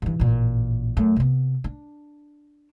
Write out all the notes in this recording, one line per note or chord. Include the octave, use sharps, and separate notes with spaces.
G2 E3
A1 A#2
F#2 A3
C3 B3
D4